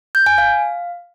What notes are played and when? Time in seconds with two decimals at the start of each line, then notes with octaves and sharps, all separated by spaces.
0.15 G6
0.26 G#5
0.38 F5